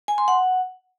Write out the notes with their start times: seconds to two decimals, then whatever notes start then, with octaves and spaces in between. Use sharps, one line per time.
0.08 G#5
0.18 C6
0.28 F#5